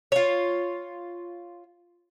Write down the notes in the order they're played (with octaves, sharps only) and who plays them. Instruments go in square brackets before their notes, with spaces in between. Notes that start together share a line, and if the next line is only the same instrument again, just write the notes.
[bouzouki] F4 C#5